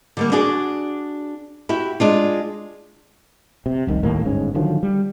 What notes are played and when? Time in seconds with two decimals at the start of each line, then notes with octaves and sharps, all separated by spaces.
0.17 D3 G3 A#3
0.32 D4 F#4 G#4 D5
1.69 E4 F#4 G4
2.00 G#3 D4 F4
3.66 C3
3.87 F1 C2 D#3
4.03 D#2 A2 A#3
4.25 G1 G#2 C#4
4.54 D3 D#3 F3 F#3
4.83 G3